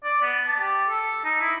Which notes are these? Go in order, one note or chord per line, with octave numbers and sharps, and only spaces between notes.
D5
B3
A5
G4
A4
D#4
E4